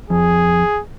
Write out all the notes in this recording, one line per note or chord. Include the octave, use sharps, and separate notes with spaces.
F2 G#4